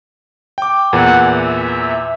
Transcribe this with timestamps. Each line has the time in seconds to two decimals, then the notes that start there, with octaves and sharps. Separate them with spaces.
0.58 G5 D6
0.93 E2 A#2 E3 F#5
1.33 E5